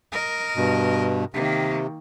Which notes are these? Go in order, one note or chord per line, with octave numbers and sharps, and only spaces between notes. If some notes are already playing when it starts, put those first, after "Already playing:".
A#4 D#5
G2 B2
C3 D#3 A#3